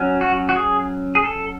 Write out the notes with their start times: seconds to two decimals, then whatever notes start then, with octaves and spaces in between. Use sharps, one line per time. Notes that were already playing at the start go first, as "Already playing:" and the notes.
Already playing: F#3 C#4
0.21 F#4
0.49 F#4
0.56 G#4
1.15 G#4
1.24 A4